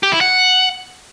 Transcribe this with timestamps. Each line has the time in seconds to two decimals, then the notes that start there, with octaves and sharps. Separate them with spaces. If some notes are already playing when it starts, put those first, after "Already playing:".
0.03 G4
0.12 E4
0.21 F#5